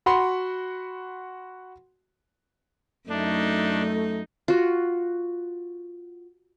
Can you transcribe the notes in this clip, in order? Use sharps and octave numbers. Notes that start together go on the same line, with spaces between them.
F#4 F#5 B5 C6
F#2 A3 D4 D#4
F4 F#4